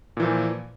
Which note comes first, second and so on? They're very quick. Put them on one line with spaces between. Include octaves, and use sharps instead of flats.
A#2 E3 F3